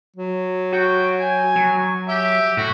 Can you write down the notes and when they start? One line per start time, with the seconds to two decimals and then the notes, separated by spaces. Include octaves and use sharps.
0.16 F#3
0.73 F#4 G5
1.19 G#5
1.56 F#3
2.08 G4 E5
2.57 A2 F#4